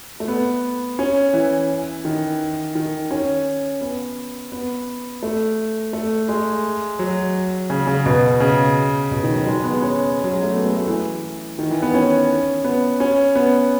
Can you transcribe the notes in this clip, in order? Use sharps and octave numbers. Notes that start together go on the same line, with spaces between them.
A3
B3
C#4
E3
D#3
D#3
C#4
B3
B3
A3
A3
G#3
F#3
C#3
C#3
B2
C#3
B2
D#3
F#3
G#3
B3
C#4
F#3
G#3
A3
B3
A3
A3
E3
D#3
E3
B3
C#4
B3
C#4
B3